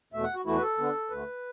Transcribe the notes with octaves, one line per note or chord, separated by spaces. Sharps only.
E2 B2 A3 E5
F#5
F#4
E2 E3 A3 E4 F#4
B4
A4
D3 B3 D4
D2 D3 A3 B4